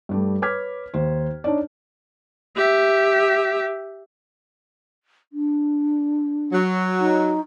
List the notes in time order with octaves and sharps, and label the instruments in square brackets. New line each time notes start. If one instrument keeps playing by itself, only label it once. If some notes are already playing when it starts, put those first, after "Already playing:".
[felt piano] G2 G3 A3
B4 C#5 D6 F6 G#6 B6
D#2 C5
D4 D#4 C#5 D5
[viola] G4 E5
[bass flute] D4
[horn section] F#3
[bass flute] D#4